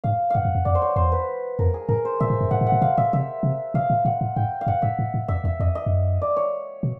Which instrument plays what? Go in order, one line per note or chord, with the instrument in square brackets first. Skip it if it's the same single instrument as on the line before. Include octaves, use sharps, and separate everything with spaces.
[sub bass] G#2 [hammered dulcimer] F5
[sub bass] G2 [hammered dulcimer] F5 F#5
[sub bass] F#2
F2
[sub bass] F2 [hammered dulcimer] D5
[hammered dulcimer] C5
C#5
[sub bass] E2 [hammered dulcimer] C5
[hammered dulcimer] B4
[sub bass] F2 [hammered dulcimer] A#4
[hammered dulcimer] G#4
[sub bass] G#2 [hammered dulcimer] A#4
[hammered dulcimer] C5
[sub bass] A#2 [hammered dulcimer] E5
[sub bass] A2
G2
[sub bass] G#2 [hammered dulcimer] F#5
[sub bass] A2
[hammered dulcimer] F#5
[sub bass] A#2
[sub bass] B2 [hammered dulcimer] F5
[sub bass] A#2 [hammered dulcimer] E5
[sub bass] C3 [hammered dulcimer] E5
[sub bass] C3
[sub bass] B2 [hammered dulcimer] F5
[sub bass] A#2
[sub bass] A#2 [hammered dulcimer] F#5
[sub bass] A2
[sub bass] G#2 [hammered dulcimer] G5
[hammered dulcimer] F5
[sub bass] G2 [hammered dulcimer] F#5
[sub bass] G#2 [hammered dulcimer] E5
[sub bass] A2
A2
[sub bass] F2 [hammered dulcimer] E5
[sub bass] E2 [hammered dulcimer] E5
[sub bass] F2 [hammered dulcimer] D#5
[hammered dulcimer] D#5
[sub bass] F2
F#2
[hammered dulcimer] D5
C#5
[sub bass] B2